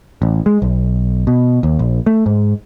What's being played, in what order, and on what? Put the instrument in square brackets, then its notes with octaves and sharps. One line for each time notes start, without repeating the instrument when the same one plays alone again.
[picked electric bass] A1
G#3
B1
B2
D#2
A#1
A3
G#2